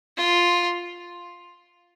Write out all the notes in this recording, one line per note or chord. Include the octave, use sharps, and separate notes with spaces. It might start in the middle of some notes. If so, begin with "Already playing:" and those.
F4